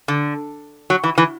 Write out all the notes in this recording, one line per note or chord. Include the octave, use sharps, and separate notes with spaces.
D3
F#3
E3
E3